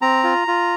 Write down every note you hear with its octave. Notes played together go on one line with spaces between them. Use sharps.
C4 A#5
F4
F4